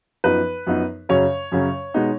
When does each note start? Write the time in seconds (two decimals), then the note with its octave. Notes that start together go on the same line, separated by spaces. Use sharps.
0.24 F#2 F3 B3 D#4 B4
0.67 F#2 F3 B3 D#4
1.09 F#2 C#3 F#3 C#4 C#5
1.52 F#2 C#3 F#3 C#4
1.94 B2 G#3 B3 D#4